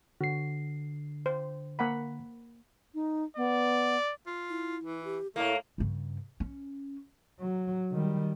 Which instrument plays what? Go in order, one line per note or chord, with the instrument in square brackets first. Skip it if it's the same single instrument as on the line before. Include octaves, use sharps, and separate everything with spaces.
[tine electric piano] D3 C7 [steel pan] F#4
[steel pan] C5
A#3 F#5 B5
[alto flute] D#4
[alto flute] B3 [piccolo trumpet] D5
[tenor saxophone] F4
[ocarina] E4
[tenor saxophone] E3
[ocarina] G4
[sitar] A2 A#3 [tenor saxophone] A3 [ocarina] E4
[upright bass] G2 C#3
C#4
[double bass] F#3
D#3 G3